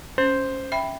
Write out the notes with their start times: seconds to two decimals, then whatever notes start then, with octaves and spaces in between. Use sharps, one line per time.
0.18 C#4 C5
0.72 E5 G5 B5